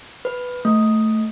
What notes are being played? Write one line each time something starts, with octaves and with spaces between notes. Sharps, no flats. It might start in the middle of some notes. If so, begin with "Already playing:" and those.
B4
A3